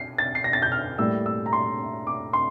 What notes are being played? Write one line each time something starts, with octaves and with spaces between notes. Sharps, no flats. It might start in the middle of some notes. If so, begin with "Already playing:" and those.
Already playing: C7
A6
C7
A#6
A6
G6
F6
A2 G3 A#3 E6
E6
A#5
C6
D6
C6